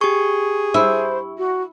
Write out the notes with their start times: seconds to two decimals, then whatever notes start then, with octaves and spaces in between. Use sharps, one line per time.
0.01 G4 G#4 C#6
0.74 E4 C5
1.38 F#4